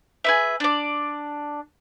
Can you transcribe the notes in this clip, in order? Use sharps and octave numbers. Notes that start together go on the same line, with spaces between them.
G#4 B4 E5
D4 D5